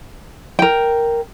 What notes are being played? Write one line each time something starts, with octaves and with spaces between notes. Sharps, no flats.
A#4 G5